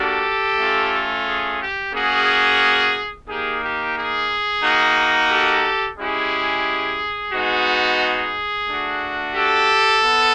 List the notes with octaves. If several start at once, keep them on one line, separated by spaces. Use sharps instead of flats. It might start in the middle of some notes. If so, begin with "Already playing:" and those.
Already playing: A#3 D4 F#4 G4 A4
A3 C#4 F4
G#4
G4
A#3 C#4 F#4 G#4
A#3 D#4 G4 G#4
G4
G#4
A#3 D#4 F#4
G4 A4
G#3 C#4 E4 G4 G#4
G#3 B3 D#4 F#4
G#4
A3 D4 F#4
G4 A4
B3